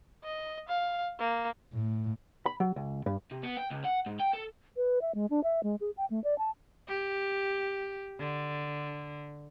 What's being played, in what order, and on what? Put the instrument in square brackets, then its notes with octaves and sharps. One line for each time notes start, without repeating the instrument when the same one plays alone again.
[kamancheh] D#5
F5
A#3
[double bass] A2
[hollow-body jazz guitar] B5
F#3
C#2
G2
[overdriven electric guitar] C3
B3
G5
C#2
F#5
G#2
G5
A4
[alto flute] B4
E5
G#3
D4
E5
G#3
G#4
G5
A3
D5
A5
[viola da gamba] G4
D3